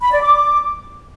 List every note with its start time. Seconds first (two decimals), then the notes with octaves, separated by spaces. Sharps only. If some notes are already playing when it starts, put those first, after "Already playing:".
0.02 B5
0.12 D5
0.23 D6